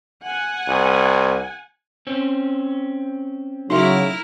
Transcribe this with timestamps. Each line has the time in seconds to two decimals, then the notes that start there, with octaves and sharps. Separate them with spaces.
0.24 F#5 G#5
0.68 C2
2.07 C4 C#4
3.70 C#3 F#3 D#4 E4 A#4 E5